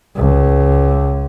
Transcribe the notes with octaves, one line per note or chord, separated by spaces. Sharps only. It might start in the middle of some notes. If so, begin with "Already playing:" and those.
C#2